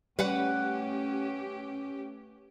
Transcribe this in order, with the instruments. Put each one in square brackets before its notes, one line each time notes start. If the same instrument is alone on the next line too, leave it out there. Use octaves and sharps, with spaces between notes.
[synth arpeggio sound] G3 [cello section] A3 C#4 G4 [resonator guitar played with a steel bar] B4 F#5